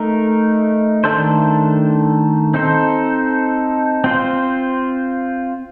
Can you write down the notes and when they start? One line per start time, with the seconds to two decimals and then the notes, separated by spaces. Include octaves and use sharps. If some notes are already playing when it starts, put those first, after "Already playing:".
Already playing: A3 D#4 A#4
1.04 D#3 A3 D4 A4 C5
2.54 C4 D#4 A4 C5
4.04 C4 F4 C5